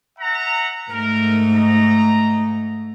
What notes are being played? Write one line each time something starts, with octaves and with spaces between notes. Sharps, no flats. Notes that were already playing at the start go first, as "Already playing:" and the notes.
E5 F#5 A#5
G#2 A3 A#4
D#5 A#5